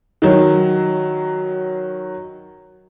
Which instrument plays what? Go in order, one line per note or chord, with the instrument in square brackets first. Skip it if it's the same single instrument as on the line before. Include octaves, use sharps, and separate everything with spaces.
[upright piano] D#3 F#3